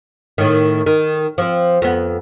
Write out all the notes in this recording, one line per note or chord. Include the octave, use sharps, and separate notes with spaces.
A2 D#3
D#3
F3 C4
F2 B3